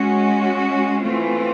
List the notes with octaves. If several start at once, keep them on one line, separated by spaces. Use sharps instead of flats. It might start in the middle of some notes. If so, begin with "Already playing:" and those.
Already playing: G#3 C#4 F#4
E3 A3 C4 F4